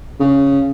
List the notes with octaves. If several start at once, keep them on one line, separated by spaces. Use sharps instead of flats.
C#3